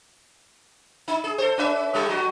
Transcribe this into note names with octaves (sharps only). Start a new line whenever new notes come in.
D#4
G#4
A4 C5
C#4 B4 E5
A2 G3 A4
F#3 F#4